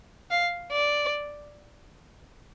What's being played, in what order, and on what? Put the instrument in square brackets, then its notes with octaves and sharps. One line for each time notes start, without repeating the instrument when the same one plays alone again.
[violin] F5
D5